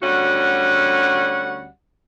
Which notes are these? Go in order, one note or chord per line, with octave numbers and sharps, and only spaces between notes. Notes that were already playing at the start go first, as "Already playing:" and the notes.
D2 G3 C#4 F#4 F#5